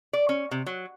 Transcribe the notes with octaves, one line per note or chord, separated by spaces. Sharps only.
D5
C#4
C3
F#3